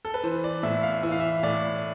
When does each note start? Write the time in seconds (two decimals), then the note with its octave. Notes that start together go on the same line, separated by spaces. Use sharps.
0.05 A4
0.14 B4
0.24 E3 C5
0.44 D5
0.63 A2 E5
0.83 F5
1.03 E3 E5
1.12 F5
1.20 E5
1.43 A2 D5